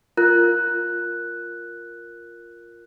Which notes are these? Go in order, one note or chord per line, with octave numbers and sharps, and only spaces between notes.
F4 A#4 F#6